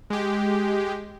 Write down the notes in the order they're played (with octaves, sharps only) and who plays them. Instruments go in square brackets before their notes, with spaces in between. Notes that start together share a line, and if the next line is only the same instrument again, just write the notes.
[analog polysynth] G#3 G4